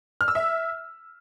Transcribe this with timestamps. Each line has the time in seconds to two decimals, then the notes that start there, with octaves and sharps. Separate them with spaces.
0.21 F6
0.28 E6
0.35 E5